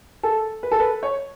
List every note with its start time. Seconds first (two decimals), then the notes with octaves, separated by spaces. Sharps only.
0.23 A4
0.63 B4
0.71 A4
0.80 B4
1.03 C#5